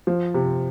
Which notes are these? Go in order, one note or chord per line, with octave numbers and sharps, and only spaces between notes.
F3
C3